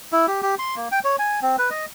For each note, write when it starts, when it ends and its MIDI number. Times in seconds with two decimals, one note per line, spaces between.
0.13 0.27 64
0.28 0.42 67
0.42 0.55 67
0.59 0.75 84
0.76 0.88 58
0.92 1.00 79
1.04 1.16 73
1.19 1.40 80
1.42 1.56 60
1.59 1.70 71
1.70 1.86 75